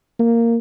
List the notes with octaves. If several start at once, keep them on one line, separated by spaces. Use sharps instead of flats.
A#3